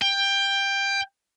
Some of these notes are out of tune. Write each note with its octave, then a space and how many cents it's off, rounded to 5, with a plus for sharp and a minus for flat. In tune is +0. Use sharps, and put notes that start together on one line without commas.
G5 +15